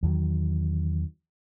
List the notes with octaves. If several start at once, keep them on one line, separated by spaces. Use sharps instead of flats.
E2 D#3 F#3